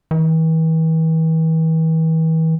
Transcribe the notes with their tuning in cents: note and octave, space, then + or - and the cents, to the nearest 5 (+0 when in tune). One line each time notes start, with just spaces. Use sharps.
E3 -40